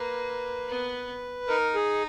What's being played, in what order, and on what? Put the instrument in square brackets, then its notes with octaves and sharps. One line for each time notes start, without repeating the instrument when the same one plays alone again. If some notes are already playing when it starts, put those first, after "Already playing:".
Already playing: [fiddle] A#3 [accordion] B4
[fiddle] B3
[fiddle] D#4 [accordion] A#4
[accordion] G#4